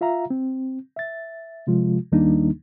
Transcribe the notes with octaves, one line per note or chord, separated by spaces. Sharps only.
F4 E5 F5 A#5
C4
E5 A6
C3 F3 G#3 F4
D#2 D#3 G3 A#3 D4 D#4